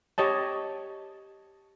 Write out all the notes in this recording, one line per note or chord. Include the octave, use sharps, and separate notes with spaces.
G4 C#5 D#5 A5